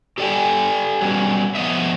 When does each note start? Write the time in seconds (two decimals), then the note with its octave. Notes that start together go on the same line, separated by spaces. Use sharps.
0.18 G4 A4 D5 E5 G5 G#5
1.01 F#3 G3 B3 C#4
1.55 F3 G3 B3 D#5 E5